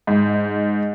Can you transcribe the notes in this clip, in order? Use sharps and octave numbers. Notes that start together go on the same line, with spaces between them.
G#2